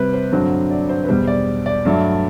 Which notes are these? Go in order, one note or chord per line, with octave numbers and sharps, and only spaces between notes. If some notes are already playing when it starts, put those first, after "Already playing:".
Already playing: C3 G3 C4 B4
C5
G2 D3 F#3 C4
D5
C5
B4
E2 B2 G3 C5
D5
D5
G2 F#3 A3